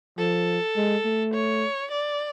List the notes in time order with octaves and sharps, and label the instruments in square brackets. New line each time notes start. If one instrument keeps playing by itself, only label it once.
[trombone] F3 [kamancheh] A4
[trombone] G#3
A3
[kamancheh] C#5
D5